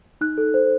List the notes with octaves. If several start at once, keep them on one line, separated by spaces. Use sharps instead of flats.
D#4 F#6
A4
C5